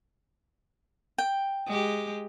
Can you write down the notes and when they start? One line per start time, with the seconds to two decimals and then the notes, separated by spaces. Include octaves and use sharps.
1.18 G5
1.67 G#3 G4